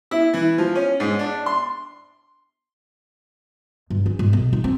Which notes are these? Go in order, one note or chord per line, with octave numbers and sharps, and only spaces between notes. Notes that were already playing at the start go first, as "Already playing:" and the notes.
E4
E3
F3
C#4
G#2
D4
C6
G2
C#4
G#2
B1
D#4
C4